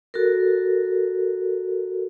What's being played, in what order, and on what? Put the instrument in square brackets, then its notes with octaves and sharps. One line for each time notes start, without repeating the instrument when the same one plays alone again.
[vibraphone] F#4 A4 A#4